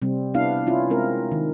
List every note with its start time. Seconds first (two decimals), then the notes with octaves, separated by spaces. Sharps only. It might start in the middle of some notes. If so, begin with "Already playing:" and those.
0.02 C3 G3 C4
0.34 B3 D4 E4 F5
0.67 C#4 E4 F4
0.90 G#3 C4 A#4
1.32 D#3